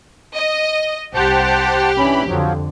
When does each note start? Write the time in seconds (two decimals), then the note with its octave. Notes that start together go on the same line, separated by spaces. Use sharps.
0.34 D#5
1.14 C2 G4 C5 F#5 A5
1.97 E3 C#4 D4 B5
2.28 F2 D3 F3 F#3